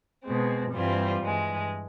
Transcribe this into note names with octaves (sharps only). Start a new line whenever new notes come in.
B2 G#3 C4
G2 E3 G3 C4 F4
G2 E3 G#3